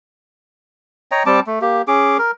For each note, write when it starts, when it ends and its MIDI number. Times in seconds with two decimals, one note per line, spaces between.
1.11 1.23 73
1.11 1.23 75
1.11 1.23 79
1.11 1.23 82
1.26 1.40 55
1.26 1.40 60
1.26 1.40 81
1.26 1.40 86
1.47 1.59 57
1.61 1.82 58
1.61 1.82 67
1.88 2.18 61
1.88 2.18 68
1.88 2.18 86
2.19 2.31 70